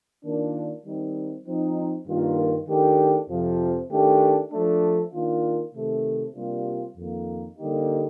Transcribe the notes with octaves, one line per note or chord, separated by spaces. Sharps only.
D#3 A#3 D4 F4
D#3 G3 C4 D#4
F3 C4 D#4
G2 D#3 A#3 F4
D#3 A3 D4 G4
F2 C3 F3
D#3 A3 D4 G4
F3 A3 D4
D#3 A#3 D4 F4
C3 D#3 A3
C3 G3 A#3 D4 F4
F2 D#3 A#3
D3 G3 A#3 D#4 G4